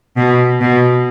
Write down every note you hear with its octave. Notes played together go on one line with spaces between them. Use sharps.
B2
B2